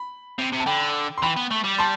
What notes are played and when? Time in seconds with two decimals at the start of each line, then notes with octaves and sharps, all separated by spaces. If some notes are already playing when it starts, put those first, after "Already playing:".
Already playing: B5
0.39 C3
0.53 C3
0.60 A5
0.66 D3 G5 B5
1.18 C6
1.22 E3 G5 B5
1.37 B3
1.51 A3
1.64 G3
1.79 A5 C6